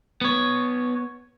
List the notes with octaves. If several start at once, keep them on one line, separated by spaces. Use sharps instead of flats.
B3 C#5